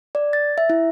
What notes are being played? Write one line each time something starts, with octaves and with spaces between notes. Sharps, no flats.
D5
A6
E5
E4